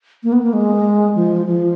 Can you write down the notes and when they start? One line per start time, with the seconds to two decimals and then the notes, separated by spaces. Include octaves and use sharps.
0.23 A#3
0.32 B3
0.43 A#3
0.53 G#3
1.15 F3
1.46 F3